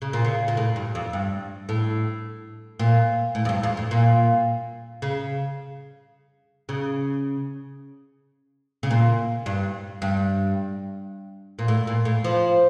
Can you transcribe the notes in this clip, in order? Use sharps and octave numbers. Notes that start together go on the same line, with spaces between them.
C#3
A#2
C#3
A#2
A2
G2
F2
G2
A2
A#2
A2
F2
G2
F2
A2
A#2
C#3
C#3
C#3
A#2
G2
G2
A#2
A2
A#2
A2
F3